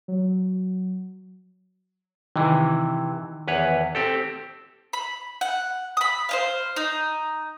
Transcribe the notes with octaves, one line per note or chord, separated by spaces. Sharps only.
F#3
C3 D#3 E3
E2 B4 C#5
C4 G4 A4
B5
F#5
B5 D#6
C5 D#5 F5
D#4